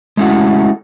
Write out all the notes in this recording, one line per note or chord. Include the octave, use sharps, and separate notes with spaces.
G#3 A3 C#4 E4 F#4